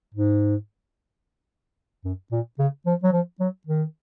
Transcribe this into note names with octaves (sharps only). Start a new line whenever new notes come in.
G#2
F#2
A#2
C#3
F3
F#3
F3
F#3
D#3